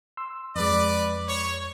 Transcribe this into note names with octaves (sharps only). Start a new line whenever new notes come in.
C6 E6
F2 G#3 B4 D5
C#5